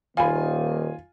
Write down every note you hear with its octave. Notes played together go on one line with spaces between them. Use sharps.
D#1 D#3 A#3 F4 F5 G#5 B5